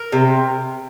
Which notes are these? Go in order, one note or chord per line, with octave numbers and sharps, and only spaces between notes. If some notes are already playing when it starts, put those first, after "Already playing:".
Already playing: A#4
C3